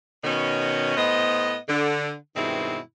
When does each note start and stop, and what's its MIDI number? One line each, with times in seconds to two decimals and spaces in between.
0.24 0.95 47
0.24 0.95 51
0.24 0.95 61
0.97 1.55 45
0.97 1.55 59
0.97 1.55 72
0.97 1.55 75
1.68 2.11 50
2.36 2.77 43
2.36 2.77 47
2.36 2.77 51
2.36 2.77 56
2.36 2.77 60
2.36 2.77 64